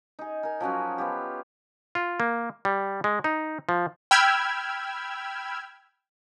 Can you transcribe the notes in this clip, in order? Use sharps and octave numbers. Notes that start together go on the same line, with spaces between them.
D#4 G#4
A#4 G#5
F3 F#3 C#4 F#4
B3 F4 G4
F4
A#3
G3
G#3
D#4
F3
G5 B5 E6 F6 G#6